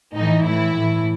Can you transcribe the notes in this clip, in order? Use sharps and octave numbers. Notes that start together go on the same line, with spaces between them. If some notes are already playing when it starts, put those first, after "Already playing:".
A2 E3 D#4
A2 E3 E4
A2 E3